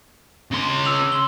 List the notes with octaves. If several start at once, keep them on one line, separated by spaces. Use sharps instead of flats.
C#3 C6
E6 F7 F#7
C6 G7